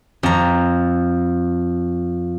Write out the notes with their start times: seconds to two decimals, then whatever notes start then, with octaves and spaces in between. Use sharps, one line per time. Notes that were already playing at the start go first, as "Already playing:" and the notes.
0.23 F2 A#5